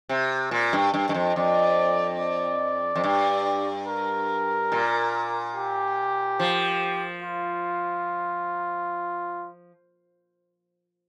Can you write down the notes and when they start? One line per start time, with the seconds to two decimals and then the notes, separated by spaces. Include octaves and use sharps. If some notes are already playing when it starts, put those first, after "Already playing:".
0.09 C3
0.51 A#2
0.73 G2
0.94 G2
1.09 G2
1.14 F2
1.35 F2 D5
2.20 D5
2.96 F2
3.04 G2
3.88 A#4
4.72 A#2
5.55 G4
6.40 F3
7.23 F4